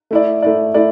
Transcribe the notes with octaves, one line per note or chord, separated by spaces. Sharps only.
A3 E4 D5
A3 E4 D5
A3 E4 D5